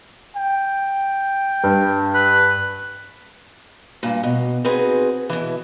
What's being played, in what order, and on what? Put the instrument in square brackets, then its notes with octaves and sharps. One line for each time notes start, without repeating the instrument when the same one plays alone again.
[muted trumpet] G5
[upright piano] G2
[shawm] B4
[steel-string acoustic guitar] G2 A#2
B2
C4 D#4 F#4 G#4 B4
B2 E3